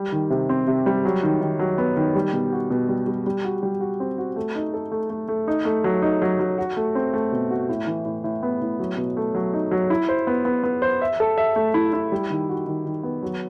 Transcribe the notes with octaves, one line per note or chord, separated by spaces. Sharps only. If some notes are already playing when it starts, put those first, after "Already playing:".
Already playing: G3
D#3
C3
C4
C3
G3
F#3
D#3
D#3
F#3
B3
D#3
G3
B2
F#4
B2
G3
G3
G3
F#4
G3
F#4
C4
F#4
A3
D#4
A4
A3
A3
A3
D#4
A3
F#3
D#4
F#3
F#3
F#4
A3
C4
A3
B2
F#4
A2
E3
A2
A2
B3
A2
F#3
B2
A3
F#3
D#4
F#3
E4
C5
B3
B3
B3
C5
E5
A4
E5
A3
E4
E4
G3
D#3
F#4
D#3
D#3
B3
F#3